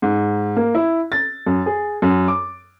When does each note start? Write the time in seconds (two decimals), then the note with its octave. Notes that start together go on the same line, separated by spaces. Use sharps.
0.02 G#2
0.57 A#3
0.75 E4
1.12 A6
1.47 F#2
1.66 G#4
2.02 F#2
2.28 D6